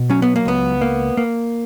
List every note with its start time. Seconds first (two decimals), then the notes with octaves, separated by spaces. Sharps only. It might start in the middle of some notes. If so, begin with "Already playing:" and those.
Already playing: B2
0.10 F#3 C#4
0.22 B3
0.36 A#3
0.45 C#2 B3
0.81 A#3
1.17 A#3